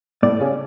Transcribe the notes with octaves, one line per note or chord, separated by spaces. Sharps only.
A2 A3 D5
C#3 C#4